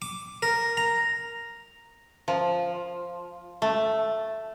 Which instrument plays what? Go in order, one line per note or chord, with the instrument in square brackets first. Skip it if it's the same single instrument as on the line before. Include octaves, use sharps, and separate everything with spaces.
[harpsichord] D6
A#4
A#5
[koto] F3
A3